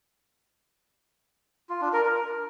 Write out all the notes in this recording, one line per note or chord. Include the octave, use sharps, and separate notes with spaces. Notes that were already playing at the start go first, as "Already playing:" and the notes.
F4
D4
A#4
A#4